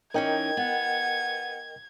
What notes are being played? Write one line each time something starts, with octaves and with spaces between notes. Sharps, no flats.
E3 C#4 D#4 A#4 D#5 G5 G#6
B3 F#5